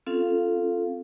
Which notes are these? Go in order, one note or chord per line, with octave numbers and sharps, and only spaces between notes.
C4 C#4 F4 A4 F5